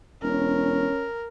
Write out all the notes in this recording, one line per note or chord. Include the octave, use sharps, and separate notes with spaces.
E1 C#4 A#4